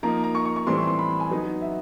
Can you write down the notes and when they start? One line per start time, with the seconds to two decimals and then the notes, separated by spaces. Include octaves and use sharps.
0.03 F3 A#3 D#4 A#5
0.24 A#5
0.35 C#6
0.45 C#6
0.56 C#6
0.67 A2 E3 G3 C4 C6
0.77 C#6
0.88 C6
0.99 B5
1.20 G#5
1.31 F#3 B3 D#4
1.62 E5